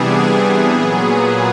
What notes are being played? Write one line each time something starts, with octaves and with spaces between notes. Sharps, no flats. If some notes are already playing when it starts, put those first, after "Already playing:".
Already playing: C3 E3 G3 B3 D4 G#4
A#2 F#3 B3